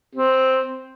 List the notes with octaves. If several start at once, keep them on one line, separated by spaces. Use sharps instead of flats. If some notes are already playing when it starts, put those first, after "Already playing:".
C4